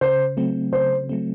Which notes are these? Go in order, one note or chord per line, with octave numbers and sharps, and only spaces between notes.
C#3 C5
F#3 A3 C4
C#3 C5
F#3 A3 C4